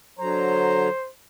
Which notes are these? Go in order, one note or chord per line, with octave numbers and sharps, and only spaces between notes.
D3 F#3 C5 A#5